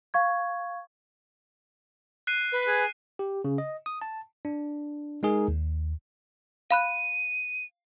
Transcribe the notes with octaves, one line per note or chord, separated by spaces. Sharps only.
F5 C#6 G#6
F#6 C7 D#7
B4
G#4 G#5
G4
C#3
D#5
D#6
A5
D4
G#3 D#4 G#4 A#4
D#2
F5 B5 F#6 D#7